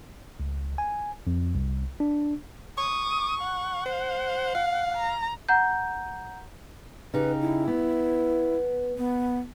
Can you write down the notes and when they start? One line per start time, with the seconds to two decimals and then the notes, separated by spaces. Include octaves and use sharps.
0.40 C#2
0.78 G#5
1.27 F2
1.55 C2
2.00 D4
2.78 C#6 D#6
3.41 F#5
3.86 C5
4.55 F5
4.97 A#5
5.49 F#5 A#5 G6
7.14 C#3 D#4 G4 B4
7.41 E4
7.68 B3
8.98 B3